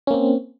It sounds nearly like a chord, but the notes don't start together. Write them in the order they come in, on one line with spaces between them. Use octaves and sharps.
C#4 A#3 C4